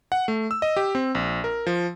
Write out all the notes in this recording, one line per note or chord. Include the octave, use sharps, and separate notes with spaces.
F#5
A3
E6
D#5
G4
C4
A#1
A#4
F3